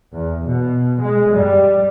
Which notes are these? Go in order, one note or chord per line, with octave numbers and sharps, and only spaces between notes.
E2
B2
G#3
G3